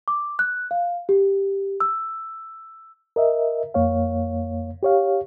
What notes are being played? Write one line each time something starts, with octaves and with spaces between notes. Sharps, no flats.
D6
F#6
F5
G4
E6
A#4 D#5 E5
F2 A#3 C#5 F5
G4 C#5 F5